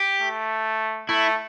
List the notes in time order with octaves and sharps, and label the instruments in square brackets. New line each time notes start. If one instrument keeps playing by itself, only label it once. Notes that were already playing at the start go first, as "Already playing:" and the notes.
Already playing: [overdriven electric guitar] G4
[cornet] A3
[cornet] A3 [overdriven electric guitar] E4